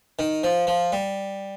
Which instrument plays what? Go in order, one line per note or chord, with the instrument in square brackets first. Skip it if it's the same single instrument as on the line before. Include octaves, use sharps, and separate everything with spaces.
[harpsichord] D#3
F3
F3
G3